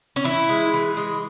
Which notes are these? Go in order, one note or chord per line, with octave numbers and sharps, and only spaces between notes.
C#4
E3 E4
G#3
E3
G#3